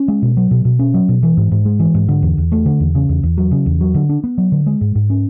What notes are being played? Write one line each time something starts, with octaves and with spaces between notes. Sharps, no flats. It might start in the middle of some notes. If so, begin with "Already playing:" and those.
Already playing: C#4
G#3
B2
F#3
B2
B2
C#4
F#3
B2
E3
G#2
G#2
G#3
E3
G#2
D3
E2
E2
A3
D3
E2
C#3
E2
E2
F#3
C#3
E2
F#3
D3
D4
B3
F#3
D3
G#3
G#2
G#2
C#4